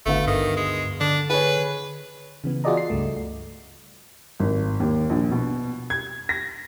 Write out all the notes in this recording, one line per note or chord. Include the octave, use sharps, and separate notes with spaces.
G#1 D2 A3 B3 F5
G2 D#3
G#3
D3 D4
G#4 B4 C#5
C#3 E3 B3
F4 F#4 G#4 D5 D#5 A#5
C7
C#2 G2 A3
G#1
D#2
A#1
B2
G#6
A#6